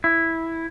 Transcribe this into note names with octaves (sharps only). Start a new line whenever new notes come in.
E4